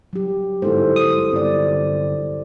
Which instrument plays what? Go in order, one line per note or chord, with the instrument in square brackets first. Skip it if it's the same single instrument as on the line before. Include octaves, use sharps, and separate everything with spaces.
[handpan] F#3 G4
[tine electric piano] G1 G#2 [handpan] E4 A4 C5
[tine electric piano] D#6
[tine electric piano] G1 [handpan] C4 D5